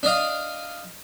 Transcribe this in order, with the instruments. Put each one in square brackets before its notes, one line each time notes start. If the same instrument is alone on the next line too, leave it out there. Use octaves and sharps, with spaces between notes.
[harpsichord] D4 D5 D#5 F5